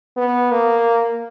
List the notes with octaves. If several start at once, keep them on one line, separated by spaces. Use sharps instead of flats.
B3
A#3